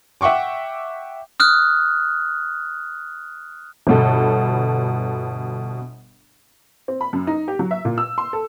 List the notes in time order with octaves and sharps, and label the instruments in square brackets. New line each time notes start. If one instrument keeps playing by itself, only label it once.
[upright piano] E5 F#5 G5 C#6 D6
[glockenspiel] D#6 F6 F#6
[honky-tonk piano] G1 B2 A4
C4
B5
F#2
D#4
G4
F#3
E5
A#2
E6
C6
A4